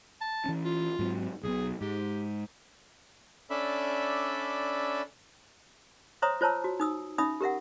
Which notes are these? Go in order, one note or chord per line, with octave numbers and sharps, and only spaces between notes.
A5
E3 C#4
F4
G#2 F#3 C4
B1 B2 G#4
G#2 G4
C#4 D4 A4 D5 E5 B5
C5 C#5 E5 A#5 C6 D#6
F4 C5 C#5 A5 A#5 E6
F#4
D#4 D#6 E6
C#4 D#4 E5 B5 D#6
G4 A#4 E5 F#5